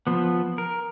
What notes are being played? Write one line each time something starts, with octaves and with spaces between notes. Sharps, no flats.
F3 B3
A#4